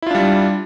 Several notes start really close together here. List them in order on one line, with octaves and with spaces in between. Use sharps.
E4 F4 D4 G3